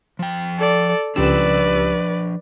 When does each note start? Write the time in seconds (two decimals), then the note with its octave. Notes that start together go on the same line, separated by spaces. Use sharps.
0.19 F3 G5
0.58 A4 D5
1.16 C#2 F3 G3 D4 B4 D5 E6